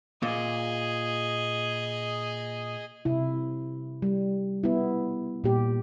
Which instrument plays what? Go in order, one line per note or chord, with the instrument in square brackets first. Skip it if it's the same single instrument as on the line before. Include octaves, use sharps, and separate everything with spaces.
[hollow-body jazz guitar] A#2 [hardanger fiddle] G#4 D#5
[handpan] C3 E4
G3
B3 E4
A#2 G4